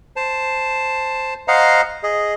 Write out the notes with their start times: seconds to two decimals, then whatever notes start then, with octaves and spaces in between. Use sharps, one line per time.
0.16 C5 A5
1.48 C5 D#5 F5 F#5 A#5
2.03 G#4 D#5